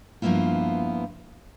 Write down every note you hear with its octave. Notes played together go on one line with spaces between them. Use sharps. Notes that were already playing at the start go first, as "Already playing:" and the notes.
G2 F3 A#3 B3 E4 F4